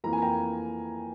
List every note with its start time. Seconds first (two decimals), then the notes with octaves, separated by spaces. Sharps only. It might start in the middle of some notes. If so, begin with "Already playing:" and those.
0.04 F2 E3 A#3 A#5
0.13 G#5
0.22 G5 A#5